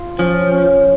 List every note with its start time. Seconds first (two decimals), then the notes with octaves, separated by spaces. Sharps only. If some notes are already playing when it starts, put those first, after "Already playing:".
Already playing: F4
0.18 F3 C#4
0.51 C#4